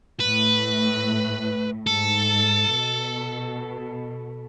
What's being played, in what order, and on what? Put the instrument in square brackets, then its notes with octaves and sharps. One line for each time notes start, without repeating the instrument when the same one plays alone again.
[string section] A2 [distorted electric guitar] B4
[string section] G#2 [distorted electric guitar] A4
[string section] B2